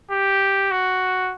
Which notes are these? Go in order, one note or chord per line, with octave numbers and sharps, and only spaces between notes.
G4
F#4